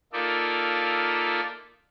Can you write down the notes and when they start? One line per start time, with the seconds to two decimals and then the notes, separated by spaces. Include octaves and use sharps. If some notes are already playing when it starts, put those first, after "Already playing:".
0.13 A#3 D#4 F4 A4 D5 E5